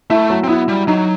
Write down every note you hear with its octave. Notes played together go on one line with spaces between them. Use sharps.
A3 E4 E5
F#3 F#4
C4
B3 E4
G3
F#3 D#4